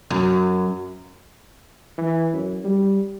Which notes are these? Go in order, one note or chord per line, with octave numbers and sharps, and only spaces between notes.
F#2
E3
F#2
G3